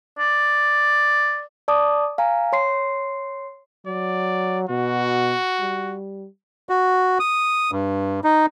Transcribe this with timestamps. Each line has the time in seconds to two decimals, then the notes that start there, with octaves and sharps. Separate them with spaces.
0.18 D5
1.68 D5 A5 D6 D#6
2.18 F5 G#5 A#5
2.53 C#5 C6 C7
3.86 F#3 D5
4.69 B2 F#4
5.60 G3
6.69 F#4
7.20 D#6
7.72 G2
8.24 D#4